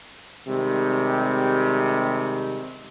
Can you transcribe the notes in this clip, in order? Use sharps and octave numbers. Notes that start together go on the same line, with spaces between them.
C3 D#3 G3 G#3